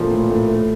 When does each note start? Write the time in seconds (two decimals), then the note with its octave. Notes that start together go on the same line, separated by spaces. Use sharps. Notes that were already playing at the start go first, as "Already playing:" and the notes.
Already playing: A#2 F3 A3
0.11 A2
0.30 A2
0.48 A3